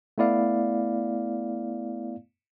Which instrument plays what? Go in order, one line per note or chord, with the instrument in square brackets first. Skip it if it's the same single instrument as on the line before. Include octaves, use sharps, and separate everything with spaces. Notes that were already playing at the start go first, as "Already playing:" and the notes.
[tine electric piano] A3 B3 E4 D5 F5